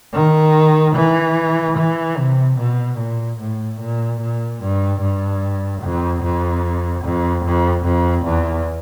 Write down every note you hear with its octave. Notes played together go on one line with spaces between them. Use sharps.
D#3
E3
E3
C3
B2
A#2
A2
A#2
A#2
G2
G2
F2
F2
F2
F2
F2
E2